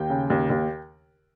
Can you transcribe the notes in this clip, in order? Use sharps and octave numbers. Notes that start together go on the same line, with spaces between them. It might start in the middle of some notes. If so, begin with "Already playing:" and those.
Already playing: D#2 G5
C#3
D#2
D#2